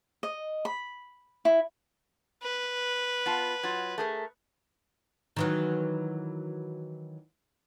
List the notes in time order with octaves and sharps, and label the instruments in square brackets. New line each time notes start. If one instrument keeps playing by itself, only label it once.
[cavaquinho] D#5
B5
E4
[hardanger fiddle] B4
[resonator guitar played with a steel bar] B3 F4 A5
F#3 F4
A3 G#4 A#4
[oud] D#3 E3 F#3